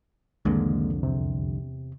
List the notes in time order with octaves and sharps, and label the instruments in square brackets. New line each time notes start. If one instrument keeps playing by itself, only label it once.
[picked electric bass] C2 F2 D3 [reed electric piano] D#3 G#3 A#3
[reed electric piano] E2 C3